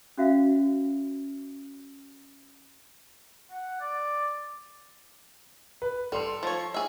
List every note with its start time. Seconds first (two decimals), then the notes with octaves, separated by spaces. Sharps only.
0.18 C#4 F#4 E5 F5
3.51 F#5
3.80 D5
5.82 B4
6.12 G3 A4 C6 F7
6.43 F3 C#5
6.74 G#4 E5